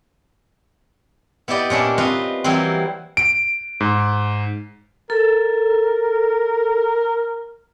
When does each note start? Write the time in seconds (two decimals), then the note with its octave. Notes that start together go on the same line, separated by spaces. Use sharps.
1.48 B3 E4 G4 D5 D#5
1.70 A#2 C#4 D4 E4
1.98 C4 F4 B4 D#5
2.44 E3 F#3 G3 A#3 C4
3.17 D7
3.80 G#2
5.10 A4 A#4